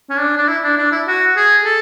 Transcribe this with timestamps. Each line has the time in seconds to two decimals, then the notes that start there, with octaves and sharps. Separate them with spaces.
0.10 C#4
0.19 D4
0.37 D4
0.48 E4
0.64 D4
0.77 D4
0.92 E4
1.07 F#4
1.36 G#4
1.65 A4